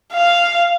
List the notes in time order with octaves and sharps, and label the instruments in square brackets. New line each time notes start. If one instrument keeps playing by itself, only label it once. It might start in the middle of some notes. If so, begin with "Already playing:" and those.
[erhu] F5